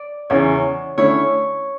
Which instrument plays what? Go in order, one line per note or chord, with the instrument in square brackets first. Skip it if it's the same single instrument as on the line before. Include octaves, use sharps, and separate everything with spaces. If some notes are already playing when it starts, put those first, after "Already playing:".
Already playing: [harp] D5
[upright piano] E2 C#3 E3 [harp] C#5
[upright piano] D3 A3 C#4 E4 [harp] C#5